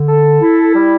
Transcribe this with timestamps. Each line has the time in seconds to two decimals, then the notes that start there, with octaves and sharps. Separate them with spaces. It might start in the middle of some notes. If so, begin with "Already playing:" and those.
Already playing: D3
0.09 A4
0.42 E4
0.75 G3